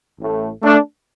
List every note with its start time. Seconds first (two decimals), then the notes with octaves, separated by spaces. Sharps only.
0.19 A1 A2 A3
0.62 A3 D4